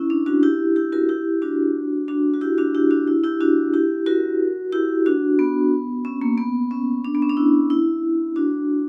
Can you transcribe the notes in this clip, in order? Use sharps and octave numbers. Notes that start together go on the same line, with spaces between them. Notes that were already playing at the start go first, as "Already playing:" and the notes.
Already playing: C#4 E4
D4
D4 F#4
E4 G4
E4 G4
F#4 A#4
E4 G4
D4 F#4
D4 F#4
F#4
E4 G4
D4 F#4
E4 G4
D4 F#4
E4
E4 G4
D4 F#4
E4 G4
F#4 A#4
E4 G4
D4 F#4
B3
C#4
A#3
B3
C#4
D4
B3
C#4
D4
E4
E4
D4 F#4